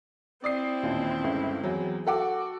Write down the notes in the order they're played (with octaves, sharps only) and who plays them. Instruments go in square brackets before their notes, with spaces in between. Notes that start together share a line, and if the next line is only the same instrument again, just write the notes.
[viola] C4 E4 [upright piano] D5 D#6 C7
[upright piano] A1 D#2 A#2
G1 C#2
E2 F#3
[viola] F#4 [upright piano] A4 F#5 D6